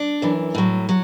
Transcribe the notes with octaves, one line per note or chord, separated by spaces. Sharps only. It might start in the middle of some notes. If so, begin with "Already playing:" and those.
Already playing: D4
F#2 E3
A2 F#3
F#3